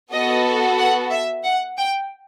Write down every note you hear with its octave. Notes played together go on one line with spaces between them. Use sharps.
B3 F#4 A4 D#5
F#5
E5
F#5
G5